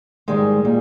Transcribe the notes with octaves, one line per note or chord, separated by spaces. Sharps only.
G#2 D#3 G3 G#3
A#2 G3